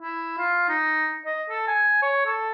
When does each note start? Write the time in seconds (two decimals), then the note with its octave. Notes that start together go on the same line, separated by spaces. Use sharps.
0.02 E4
0.38 F4
0.69 D#4
1.26 D#5
1.50 A4
1.68 G#5
2.03 C#5
2.26 A4